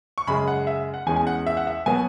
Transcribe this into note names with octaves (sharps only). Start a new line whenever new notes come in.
C#6
F#2 C#3 G#3 B5
F#5
E5
F#5
E2 E3 G#3 C#4 G#5
G#5
F#5
E5
F#5
E5
B2 F#3 B3 G#5